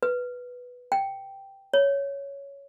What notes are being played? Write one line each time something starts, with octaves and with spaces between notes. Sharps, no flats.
B4
G5
C#5